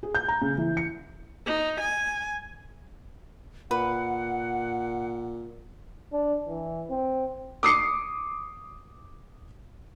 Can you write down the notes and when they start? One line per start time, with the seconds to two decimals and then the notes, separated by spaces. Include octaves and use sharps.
0.03 G#4
0.15 G6
0.28 A#5
0.42 C#3
0.58 E3
0.77 C#7
1.46 D#4
1.80 G#5
3.71 A#2 B4 F#5
6.12 D4
6.48 E3
6.90 C4
7.63 D6 D#6 C7 C#7